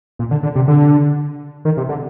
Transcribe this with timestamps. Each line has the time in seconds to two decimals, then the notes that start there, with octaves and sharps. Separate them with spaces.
0.19 A#2
0.31 D3
0.43 D3
0.56 C3
0.68 D3
1.65 D#3
1.77 C3
1.89 D3